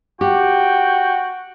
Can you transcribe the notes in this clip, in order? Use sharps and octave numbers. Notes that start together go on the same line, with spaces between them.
F#4 G4 G5